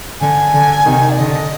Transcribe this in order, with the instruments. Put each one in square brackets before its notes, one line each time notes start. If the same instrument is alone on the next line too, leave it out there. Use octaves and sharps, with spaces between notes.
[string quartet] D3 [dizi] G#5
[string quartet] D3
C3 D#3
[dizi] D5
[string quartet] D3 [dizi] D#5